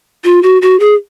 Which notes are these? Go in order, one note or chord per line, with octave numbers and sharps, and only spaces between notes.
F4
F#4
F#4
G#4